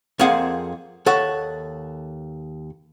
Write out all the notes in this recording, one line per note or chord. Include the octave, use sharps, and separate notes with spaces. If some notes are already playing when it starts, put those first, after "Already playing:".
F2 A#3 C4 G#4 F5 F#5
D#2 A4 C#5 F#5